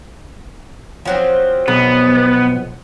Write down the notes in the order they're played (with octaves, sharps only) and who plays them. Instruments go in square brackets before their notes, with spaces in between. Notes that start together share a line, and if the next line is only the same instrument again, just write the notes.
[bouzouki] F3 F#3 C4
[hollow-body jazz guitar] B1 [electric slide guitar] B3